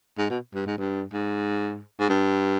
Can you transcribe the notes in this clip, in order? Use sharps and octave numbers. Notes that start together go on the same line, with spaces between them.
G#2
B2
G2
G#2
G2
G#2
G#2
G2